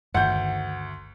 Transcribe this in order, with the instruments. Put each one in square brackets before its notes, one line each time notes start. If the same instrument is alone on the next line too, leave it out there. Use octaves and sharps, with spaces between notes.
[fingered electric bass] G1 G2 D#3 [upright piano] D2 G6 [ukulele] F#5